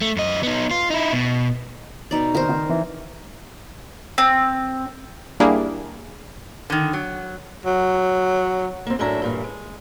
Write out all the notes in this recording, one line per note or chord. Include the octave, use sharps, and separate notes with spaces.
A3
F#2 D#5
B3 D#4
F4
D#4 E4
B2
B2 D#4 D5
D#3 A#4 C5
D#3
E3
C4
G3 A#3 D4 E4 G4 G#4
D3 D#3
F#3
F#3
A#3 C4
F#2 A2 C#4 D4 E5 A#5
G2 A#2 E3
G#3